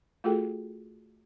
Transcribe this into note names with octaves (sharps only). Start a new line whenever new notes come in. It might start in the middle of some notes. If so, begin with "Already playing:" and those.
A3 F4 F#4 G#4 A4 G5